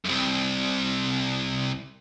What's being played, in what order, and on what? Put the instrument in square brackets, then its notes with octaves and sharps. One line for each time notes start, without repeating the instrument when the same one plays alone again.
[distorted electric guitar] C2 F#2